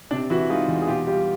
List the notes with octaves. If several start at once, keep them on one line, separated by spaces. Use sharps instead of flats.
C3 D4
E3 E4 F#4
G#3 D#4 F4
E2
G#4
B2 F4 G4
G3 F4 G4